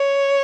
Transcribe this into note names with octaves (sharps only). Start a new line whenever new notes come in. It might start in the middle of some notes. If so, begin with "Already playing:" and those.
Already playing: C#5